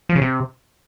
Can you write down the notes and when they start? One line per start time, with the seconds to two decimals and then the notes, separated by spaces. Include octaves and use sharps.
0.09 F3
0.15 C#3
0.22 C3